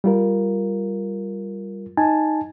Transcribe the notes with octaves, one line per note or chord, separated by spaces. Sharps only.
G3 F4 A#4
D#4 G#5 A5